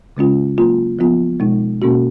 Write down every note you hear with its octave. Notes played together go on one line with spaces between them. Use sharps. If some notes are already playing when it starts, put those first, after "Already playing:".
C#3 G#3 C#4 F4
F#3 A#3 F4
F3 B3 F4
B2 G#3 D#4
B2 A#3 C#4 F#4